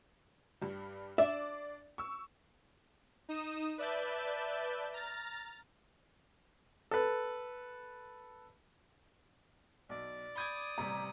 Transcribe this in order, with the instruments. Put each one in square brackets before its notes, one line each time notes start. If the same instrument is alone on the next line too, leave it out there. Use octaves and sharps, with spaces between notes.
[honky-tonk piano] G2 G3
[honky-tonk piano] D4 D5 [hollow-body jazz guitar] E5
[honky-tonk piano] C#6 E6
[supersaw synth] D#4 D#6 E7
B4 D5 E5 A5 G6
A#5 F6 A6
[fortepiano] A4 B4
[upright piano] B1 [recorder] D5
[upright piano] B5 G6 G#6 [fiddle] D6 D#6
[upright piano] A1 C3 G3 [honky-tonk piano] A#5